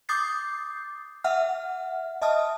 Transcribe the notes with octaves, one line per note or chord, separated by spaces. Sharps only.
D6 D#6 G6 A6 C7
E5 F#5 F6
D#5 E5 A5 D#6 F6